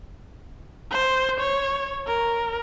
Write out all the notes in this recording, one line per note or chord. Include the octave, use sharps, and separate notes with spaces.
C5
C#5
A#4